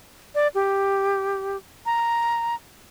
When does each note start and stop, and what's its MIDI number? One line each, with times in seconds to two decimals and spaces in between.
0.35 0.48 74
0.55 1.57 67
1.86 2.55 82